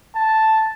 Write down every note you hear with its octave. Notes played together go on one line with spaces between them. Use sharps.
A5